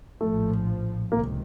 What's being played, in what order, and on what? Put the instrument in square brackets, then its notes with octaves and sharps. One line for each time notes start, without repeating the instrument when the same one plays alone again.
[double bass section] A#1 A2 F3 [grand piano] A3
[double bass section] C#2 C3 D#3 [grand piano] A#3